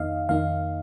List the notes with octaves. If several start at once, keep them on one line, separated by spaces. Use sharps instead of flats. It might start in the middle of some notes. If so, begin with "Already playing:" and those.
Already playing: F2 D#3 A#3 D#4 D#5 F5
F2 D#3 A#3 D#4 F5